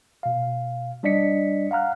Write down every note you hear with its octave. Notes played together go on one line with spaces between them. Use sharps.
B2 F5
G3 D4 D5 D#5 B6 C#7
F5 F#5 A#5 F6 F#6